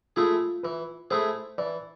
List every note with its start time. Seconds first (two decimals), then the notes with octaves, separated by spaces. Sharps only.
0.16 A3 E4 F4 G#4
0.63 E3 B4
1.11 A3 E4 G#4 C5
1.58 E3 D5